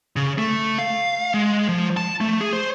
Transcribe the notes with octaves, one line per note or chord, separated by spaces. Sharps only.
C#3
A3
F5
G#3
F3
A5
A3
G#4
C5